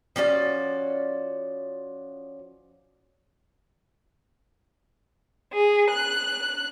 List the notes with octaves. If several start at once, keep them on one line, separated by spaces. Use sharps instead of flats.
F3 C#4 F#4 D5
G#4
F#6